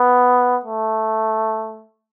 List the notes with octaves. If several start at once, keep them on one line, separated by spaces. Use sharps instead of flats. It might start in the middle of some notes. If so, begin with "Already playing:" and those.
Already playing: B3
A3